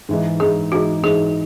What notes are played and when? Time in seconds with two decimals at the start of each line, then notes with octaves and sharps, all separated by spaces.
0.09 G#2 E3 G#3 D#4
0.40 G#2 E3 G#3 D#4 G#4
0.72 G#2 E3 G#3 D#4 F#4
1.03 G#2 E3 G#3 D#4 G#4